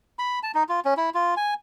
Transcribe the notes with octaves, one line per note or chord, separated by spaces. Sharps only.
B5
A5
D#4
F4
C#4
E4
F4
G#5